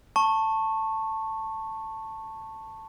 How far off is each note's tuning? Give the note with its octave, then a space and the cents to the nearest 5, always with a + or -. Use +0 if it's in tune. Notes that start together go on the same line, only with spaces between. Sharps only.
A5 +10 C#6 -15